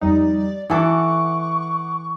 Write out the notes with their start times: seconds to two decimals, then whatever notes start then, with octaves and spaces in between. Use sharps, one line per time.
0.01 F2 G3 D#4 D5
0.70 E3 A4 F#5 C#6 D6